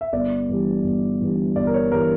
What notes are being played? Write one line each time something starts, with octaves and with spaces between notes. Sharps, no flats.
E5
G1 D5
G2 E3 G3
G1
G2 E3 G3
G1 D5
A#4
C#5
G2 E3 G3 A#4